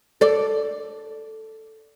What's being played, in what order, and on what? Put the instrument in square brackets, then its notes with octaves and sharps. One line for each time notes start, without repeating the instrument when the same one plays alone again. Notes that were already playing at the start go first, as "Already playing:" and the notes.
[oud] A4 D5